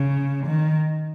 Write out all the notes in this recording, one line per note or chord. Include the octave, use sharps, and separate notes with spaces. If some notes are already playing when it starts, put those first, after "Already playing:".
Already playing: C#3
D#3